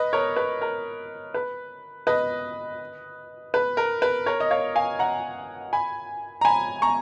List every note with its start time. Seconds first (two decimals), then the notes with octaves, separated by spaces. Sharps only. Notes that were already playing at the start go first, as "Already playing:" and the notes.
Already playing: B4 D#5
0.13 A#4 C#5
0.36 B4
0.62 A#4
1.34 B4
2.07 B4 D#5
3.54 B4
3.77 A#4
4.02 B4
4.26 A#4 C#5
4.40 D#5
4.51 C#5 F5
4.75 F5 G#5
4.99 F#5 A#5
5.73 G#5 B5
6.41 A#5
6.45 G#5 B5
6.82 A#5 C#6